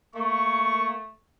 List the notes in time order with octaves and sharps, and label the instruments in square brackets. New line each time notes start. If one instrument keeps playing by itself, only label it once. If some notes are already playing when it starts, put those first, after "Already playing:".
[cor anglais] A3 [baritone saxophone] A#3 [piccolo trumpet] C#6